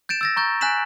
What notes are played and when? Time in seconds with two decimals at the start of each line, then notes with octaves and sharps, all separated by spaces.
0.09 G6 A6 D7 E7
0.21 E6 A6 A#6
0.36 A#5 C#6 G6 A6
0.61 G#5 F#6 G6 B6 E7 F#7